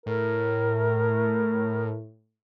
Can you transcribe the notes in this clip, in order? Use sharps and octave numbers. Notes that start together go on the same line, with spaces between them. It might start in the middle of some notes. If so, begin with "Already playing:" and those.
A2 A#4